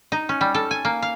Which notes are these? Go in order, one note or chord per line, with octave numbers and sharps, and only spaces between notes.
D#4
C#4
G3
A4
G#5
A#3
F5